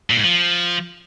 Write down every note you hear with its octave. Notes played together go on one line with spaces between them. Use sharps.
A#2
G#2
F3